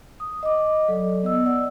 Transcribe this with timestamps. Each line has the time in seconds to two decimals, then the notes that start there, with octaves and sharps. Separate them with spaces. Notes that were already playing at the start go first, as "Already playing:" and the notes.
0.20 D#6
0.43 D#5 D6
0.88 F#3 A4 D5
1.23 B3 D#5 E6
1.45 D5 F#5 E6